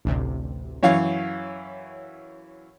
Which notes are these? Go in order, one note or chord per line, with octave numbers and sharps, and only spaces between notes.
A1 D2 C3
F#2 E3 C#5 F5